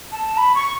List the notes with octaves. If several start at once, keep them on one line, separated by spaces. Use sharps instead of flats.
A5
B5
C#6